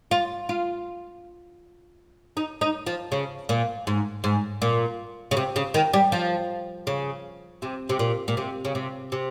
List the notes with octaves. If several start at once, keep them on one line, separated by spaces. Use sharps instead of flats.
F4
F4
D#4
D#4
F3
C#3
A#2
G#2
G#2
A#2
C#3
C3
C#3
D#3
G3
F3
C#3
C3
C3
A#2
A#2
C3
C#3
C3
C3